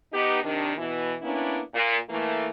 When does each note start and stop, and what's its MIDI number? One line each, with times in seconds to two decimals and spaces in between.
0.13 0.38 59
0.13 0.38 63
0.13 0.38 67
0.43 0.72 48
0.43 0.72 51
0.43 0.72 62
0.77 1.15 47
0.77 1.15 52
1.21 1.59 58
1.21 1.59 59
1.21 1.59 61
1.21 1.59 62
1.21 1.59 64
1.74 1.96 46
2.10 2.50 52
2.10 2.50 57
2.10 2.50 58